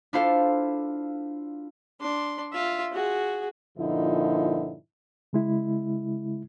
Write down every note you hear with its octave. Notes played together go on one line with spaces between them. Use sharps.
D4 E4 F4 A4 C5 F5
D4 C6
F4 E5
F#4 G#4
G2 A#2 D3 F3 D#4 E4
C#3 G#3 E4